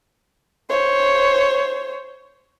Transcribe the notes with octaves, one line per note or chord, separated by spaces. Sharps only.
C5 C#5